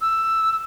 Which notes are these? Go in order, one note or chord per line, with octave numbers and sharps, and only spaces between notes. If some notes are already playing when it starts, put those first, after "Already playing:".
E6